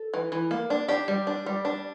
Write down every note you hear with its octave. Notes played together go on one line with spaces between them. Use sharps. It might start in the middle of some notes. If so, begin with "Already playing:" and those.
Already playing: A4
E3
E3
A#3
D4
D4 G4
G3
D4
G3
D4